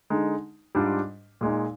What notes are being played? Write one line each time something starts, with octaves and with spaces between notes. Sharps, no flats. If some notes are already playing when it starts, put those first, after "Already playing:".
D3 G#3 D#4
G#2 G3 D4 F4
A#2 G#3 D#4